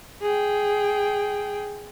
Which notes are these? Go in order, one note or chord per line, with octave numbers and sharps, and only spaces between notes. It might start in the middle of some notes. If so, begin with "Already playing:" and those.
G#4 G5